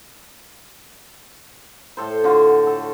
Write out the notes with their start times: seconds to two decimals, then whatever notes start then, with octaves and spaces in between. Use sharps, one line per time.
1.97 A2 A4 C5
2.24 D3 F4 F#4
2.67 A4